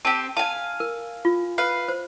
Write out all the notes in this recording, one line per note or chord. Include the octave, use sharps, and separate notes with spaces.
C4 G4 A5
F5 G#5 A5
A#4
F4
B4 F5
C5